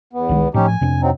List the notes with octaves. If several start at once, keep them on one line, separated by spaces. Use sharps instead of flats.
E2 B3
C2 D#3 G#3
A2 F3 C#4 D#4 G4
G#5
F2 C3 D4
F#3 C4 D#4